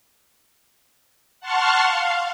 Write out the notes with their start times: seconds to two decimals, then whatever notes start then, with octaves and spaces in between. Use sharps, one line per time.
1.40 F#5 A5 C6 C#6 F6
1.84 F5